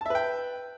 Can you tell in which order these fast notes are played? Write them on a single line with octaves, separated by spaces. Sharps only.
A5 E5 B4 G5